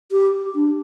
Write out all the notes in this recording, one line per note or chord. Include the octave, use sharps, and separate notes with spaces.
G4
D4